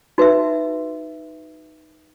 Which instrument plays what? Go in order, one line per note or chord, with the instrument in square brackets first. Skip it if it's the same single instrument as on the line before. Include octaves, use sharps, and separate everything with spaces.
[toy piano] D#4 F#4 B4 E5